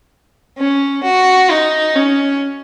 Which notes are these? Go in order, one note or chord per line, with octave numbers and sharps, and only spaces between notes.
C#4
F#4
D#4
C#4